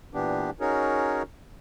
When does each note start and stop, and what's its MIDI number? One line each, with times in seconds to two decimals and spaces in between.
0.14 0.50 46
0.14 0.50 52
0.14 0.50 59
0.14 0.50 62
0.14 0.50 67
0.60 1.23 61
0.60 1.23 63
0.60 1.23 66
0.60 1.23 68
0.60 1.23 70
0.60 1.23 73